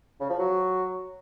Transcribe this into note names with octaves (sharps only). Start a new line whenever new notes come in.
C#3
F3
F#3